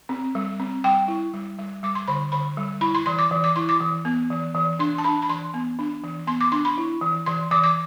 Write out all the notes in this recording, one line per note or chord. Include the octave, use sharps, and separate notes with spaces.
C4
G3
C4
G3 G5
E4
G3
G3
G3 D6
C6
D3 B5
D3 B5
G3
E4 B5
C6
E3 C6
D6
E3
D6
E4 C6
D6
E3
B3
E3
E3
D4 C6
A5
D4 B5
B5
E3 C6
B3
D4
E3
B3 C6
D6
D4 C6
B5
E4
E3
E3 C6
E3 D6
D6